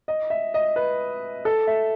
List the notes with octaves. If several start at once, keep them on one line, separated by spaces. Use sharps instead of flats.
D#5
E5
D#5
B4
A4
E5